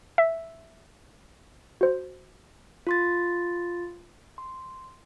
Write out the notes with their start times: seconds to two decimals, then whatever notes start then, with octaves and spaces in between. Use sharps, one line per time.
0.18 E5
1.81 F#4 C5
2.87 F4 C6 A6
4.38 C6